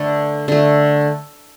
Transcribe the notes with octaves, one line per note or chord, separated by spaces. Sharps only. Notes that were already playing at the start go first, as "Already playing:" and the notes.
Already playing: D3 A3 B4 D5
D3 A3